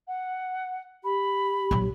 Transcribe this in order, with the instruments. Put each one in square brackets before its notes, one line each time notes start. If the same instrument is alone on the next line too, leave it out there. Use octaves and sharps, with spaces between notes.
[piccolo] F#5
[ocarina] G4 [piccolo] B5
[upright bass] A#1 F#3